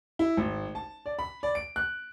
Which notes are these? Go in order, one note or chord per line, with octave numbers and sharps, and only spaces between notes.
E4
G#1
A5
D5
B5
D5
D7
F#6